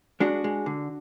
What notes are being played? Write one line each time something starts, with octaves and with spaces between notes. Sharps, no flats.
G#3 D4 F#4
G#3
D3